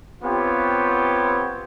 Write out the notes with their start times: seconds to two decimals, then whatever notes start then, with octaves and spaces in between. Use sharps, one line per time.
0.22 B3 C4 F4 G4 C#5